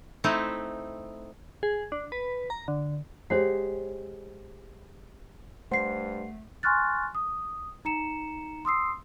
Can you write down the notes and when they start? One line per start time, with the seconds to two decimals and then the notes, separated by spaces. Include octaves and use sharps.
0.24 A3 C4 D#4 E4
1.63 G#4
1.92 D4
2.12 B4
2.50 A#5
2.68 D3
3.30 G#3 G4 C5 C#5 F#5
5.72 G2 A3 C5 F#5 C7
6.63 G#5 C6 C#6 F6 F#6 A6
7.15 D#6
7.85 D#4 A#5 C#7 E7
8.65 C6 D#6 E6 C7